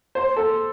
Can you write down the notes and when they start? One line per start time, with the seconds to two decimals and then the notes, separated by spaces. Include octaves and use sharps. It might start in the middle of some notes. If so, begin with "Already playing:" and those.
0.15 C5
0.36 A4